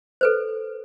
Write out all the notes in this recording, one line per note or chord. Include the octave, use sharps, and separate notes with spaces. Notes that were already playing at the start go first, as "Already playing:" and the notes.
A4 B4 C5